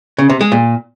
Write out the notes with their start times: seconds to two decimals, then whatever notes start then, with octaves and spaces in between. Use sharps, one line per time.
0.18 C#3
0.30 C3
0.41 G#3
0.52 A#2